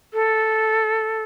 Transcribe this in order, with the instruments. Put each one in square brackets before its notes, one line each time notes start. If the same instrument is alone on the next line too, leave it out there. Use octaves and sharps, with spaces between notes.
[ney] A4